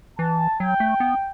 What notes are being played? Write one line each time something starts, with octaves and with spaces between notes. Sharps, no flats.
E3 A5
F#3 G5
A3
B3